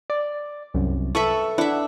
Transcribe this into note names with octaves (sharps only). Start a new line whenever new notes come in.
D5
C2 F#2
A4 B4 E5 C#6
D4 E4 E5 F#5